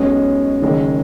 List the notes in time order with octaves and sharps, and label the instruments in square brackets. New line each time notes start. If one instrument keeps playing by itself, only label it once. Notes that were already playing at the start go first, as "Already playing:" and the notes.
Already playing: [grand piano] B1 B2 G#3 [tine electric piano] C#4 C#5
[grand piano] F#1 F#2 D#3 G#3